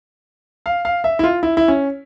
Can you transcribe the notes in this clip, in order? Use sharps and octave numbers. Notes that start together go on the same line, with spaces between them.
F5
F5
E5
E4
F4
E4
E4
C#4